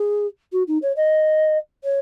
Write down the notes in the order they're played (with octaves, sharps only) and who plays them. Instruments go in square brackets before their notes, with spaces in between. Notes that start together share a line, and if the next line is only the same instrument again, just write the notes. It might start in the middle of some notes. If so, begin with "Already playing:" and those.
Already playing: [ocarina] G#4
F#4
D#4
C#5
D#5
C#5